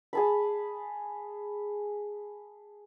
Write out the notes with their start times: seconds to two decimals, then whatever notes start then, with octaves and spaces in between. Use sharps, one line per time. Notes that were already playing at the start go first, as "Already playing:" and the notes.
0.13 G#4 A5 B5